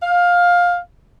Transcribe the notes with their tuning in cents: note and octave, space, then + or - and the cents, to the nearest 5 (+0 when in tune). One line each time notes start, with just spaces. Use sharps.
F5 +15